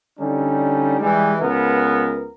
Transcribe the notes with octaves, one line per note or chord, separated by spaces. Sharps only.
D3 G3 C#4 D#4
E3 G3 G#3
C#2 B3 A#4